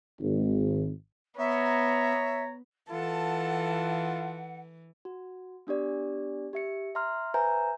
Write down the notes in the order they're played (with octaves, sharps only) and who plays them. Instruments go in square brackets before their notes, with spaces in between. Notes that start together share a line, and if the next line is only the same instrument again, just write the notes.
[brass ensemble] G#1
[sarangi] B3 [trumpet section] C#5 A#5 [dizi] E5
[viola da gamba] E3 [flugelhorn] F4 [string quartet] A4 A5 [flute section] F#5
[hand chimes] F#4
B3 D4 G4 D5
G4 E5 C#7
E5 A#5 C6 F6
B4 C5 E5 G#5 A#5 G6